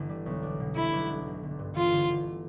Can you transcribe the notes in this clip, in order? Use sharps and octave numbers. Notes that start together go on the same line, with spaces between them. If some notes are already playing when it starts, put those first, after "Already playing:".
Already playing: G1 E3
G3
B1
D4
B2
A3 E4
B1
D4
G1
G1
G2
E3 F4
G1
G1